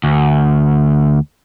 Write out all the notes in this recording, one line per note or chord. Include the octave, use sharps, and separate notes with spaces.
D2